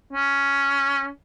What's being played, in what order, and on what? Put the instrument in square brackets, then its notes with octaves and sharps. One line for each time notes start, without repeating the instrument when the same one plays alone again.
[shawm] C#4